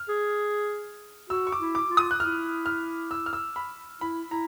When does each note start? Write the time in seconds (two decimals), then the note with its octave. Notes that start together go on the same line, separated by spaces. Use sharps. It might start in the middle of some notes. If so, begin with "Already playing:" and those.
Already playing: F6
0.09 G#4
1.29 F#4 E6
1.47 C#6
1.52 D6
1.60 E4
1.75 D6
1.90 F4
1.97 D#6
2.11 F#6
2.20 E4 F6
2.66 F6
3.11 E6
3.26 F6
3.33 E6
3.56 B5
4.01 E4 B5
4.31 E4 A#5